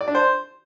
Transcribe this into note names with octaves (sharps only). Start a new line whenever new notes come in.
D5
D4
C5